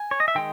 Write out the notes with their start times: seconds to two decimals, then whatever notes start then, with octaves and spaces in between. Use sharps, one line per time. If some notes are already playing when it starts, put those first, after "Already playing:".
Already playing: G#5
0.11 C#5
0.20 D#5
0.28 E5
0.35 D#3 G#3 G5